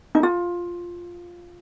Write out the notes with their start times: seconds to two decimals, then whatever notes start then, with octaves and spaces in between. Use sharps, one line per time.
0.15 D#4
0.23 F4